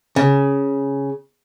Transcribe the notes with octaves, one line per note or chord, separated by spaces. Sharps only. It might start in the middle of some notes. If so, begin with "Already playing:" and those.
C#3